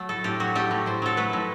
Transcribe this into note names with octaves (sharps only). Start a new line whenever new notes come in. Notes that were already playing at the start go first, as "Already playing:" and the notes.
Already playing: F#3 A3
A2 A4
A2 G4
F#3 F#4
A3 G4
A2
A2 C5
F#3 A4
A3 B4
A2